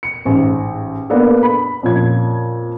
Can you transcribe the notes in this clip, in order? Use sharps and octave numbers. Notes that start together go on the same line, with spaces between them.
C#7
A1 G#2
A#3 B3 D4 A4
B5
F2 A#2 C#4 G#6